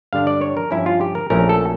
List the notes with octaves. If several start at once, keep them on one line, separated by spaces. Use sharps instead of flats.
G2 D3 G3 D4 F5
D5
C#5
A#4
G2 F3 C#4 E4
F4
G4
A#4
A#1 A#2 A3 C#4 E4 A#4
A4